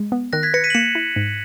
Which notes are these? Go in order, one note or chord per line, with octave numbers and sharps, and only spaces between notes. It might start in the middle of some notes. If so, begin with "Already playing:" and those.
Already playing: G#3
B3
D#3 F#6 A#6
G#6 B6
B4 A#6 C#7
B6 D#7
F#7
A#3 C#7 E7
E4
G#2